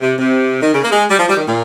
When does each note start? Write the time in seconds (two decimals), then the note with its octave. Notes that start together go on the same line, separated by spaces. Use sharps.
0.01 C3
0.19 C3
0.62 D#3
0.74 C#3
0.83 A#3
0.92 G#3
1.10 G3
1.19 F3
1.29 G3
1.37 D#3
1.47 A#2